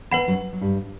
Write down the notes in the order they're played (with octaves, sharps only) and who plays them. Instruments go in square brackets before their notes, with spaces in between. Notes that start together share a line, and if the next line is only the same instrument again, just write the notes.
[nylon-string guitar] E2 E3 [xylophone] B4 F#5 B5
[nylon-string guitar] F#2 F#3
F#3
G2 G3